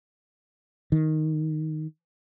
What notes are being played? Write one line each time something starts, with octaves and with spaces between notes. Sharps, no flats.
D#3